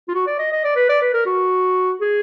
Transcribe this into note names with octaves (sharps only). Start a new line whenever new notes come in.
F4
F#4
D5
D#5
D#5
D5
B4
D5
B4
A#4
F#4
G#4